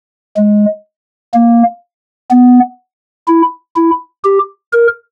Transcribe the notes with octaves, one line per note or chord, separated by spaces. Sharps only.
G#3
A#3
B3
E4
E4
G4
A#4